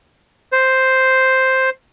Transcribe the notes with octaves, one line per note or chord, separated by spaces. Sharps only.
C5